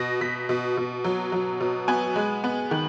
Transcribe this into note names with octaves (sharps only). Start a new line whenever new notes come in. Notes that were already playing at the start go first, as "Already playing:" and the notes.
Already playing: B2 A#6
B2 B6
B2
B2
F#3
F#3
B2
B3 G#5
G#3
B3
D#3